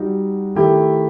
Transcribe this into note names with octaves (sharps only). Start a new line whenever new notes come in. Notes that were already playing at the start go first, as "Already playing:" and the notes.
Already playing: G3 D#4 F#4
D#3 A3 E4 G4